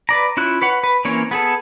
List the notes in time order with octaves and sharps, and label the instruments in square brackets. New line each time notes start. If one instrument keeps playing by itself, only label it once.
[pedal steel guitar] B4 D5 A#5
C#4 E4 F4 F#6
B4 C#5 F#5
B4
E3 A#3 C4 C#4 C#5
B3 G#4 A4